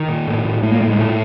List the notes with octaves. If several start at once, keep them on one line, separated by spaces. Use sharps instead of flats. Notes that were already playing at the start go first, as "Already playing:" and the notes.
Already playing: D#3
A#2
A2
A2
A2 A3
A#3
A2 A3
G#3
A#2 A3